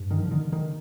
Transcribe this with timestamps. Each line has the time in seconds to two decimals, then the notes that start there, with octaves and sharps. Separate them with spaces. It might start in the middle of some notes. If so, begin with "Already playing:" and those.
Already playing: G2
0.10 D3 D#3
0.22 F3
0.31 D3 D#3
0.52 D3 D#3